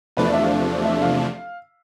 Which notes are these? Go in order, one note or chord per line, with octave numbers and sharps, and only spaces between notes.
E2 C3 F3 A3 D4 B4
D5
E5
F5
E5
F5